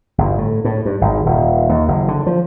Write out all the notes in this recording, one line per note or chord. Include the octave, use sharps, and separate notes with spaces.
G1
A2
A2
G2
G#1
D#1
D#2
F#1
D3
F3